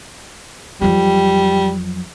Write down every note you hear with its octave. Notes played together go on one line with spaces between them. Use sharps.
F2 F#3 G3